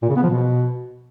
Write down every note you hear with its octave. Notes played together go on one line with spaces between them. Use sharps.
A#2
C#3
B3
F3
B2